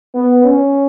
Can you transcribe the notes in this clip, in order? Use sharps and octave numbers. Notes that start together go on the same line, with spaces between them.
B3
C#4